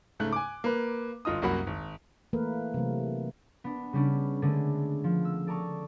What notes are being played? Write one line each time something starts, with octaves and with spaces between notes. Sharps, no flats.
G#2 C#3 A3 F#6
G#5 D6
A#3 B4
G1 F4 D#5 D#6
C2 F#2 A#3 F#4 F#5 B5
G#1
E3 A3 A#3 A#4 B4
C3 E3 F#3 A3 C4
B3 D4
C#3 G3 C#4 D4
D3 G#3 A3 D4 G#4
F3
E6
A4 D5 A5 A#5 C#6 D#6